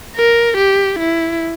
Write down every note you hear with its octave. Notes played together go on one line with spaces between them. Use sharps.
A#4
G4
E4